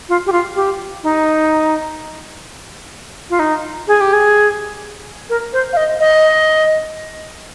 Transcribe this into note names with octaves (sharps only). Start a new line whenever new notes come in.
F4
G4
F4
G4
D#4
F4
D#4
G#4
G4
G#4
A#4
C5
F5
D#5
D#5